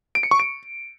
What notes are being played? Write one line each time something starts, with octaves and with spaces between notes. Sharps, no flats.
D7
C#7
C#6
D7